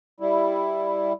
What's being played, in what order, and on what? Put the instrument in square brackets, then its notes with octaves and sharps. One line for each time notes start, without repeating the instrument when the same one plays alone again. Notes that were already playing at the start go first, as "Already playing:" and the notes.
[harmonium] G3 E4